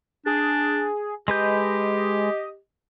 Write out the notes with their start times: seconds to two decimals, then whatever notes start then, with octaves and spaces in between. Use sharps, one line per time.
0.26 D4 G#4
1.28 G#3 G4 B4 D#5 G6